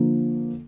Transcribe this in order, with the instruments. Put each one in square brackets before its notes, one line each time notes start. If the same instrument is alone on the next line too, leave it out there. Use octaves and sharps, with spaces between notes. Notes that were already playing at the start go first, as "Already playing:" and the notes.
Already playing: [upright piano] D3 F3 A#3